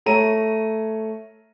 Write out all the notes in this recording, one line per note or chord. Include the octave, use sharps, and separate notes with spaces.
A3 C#5 A#5 D#7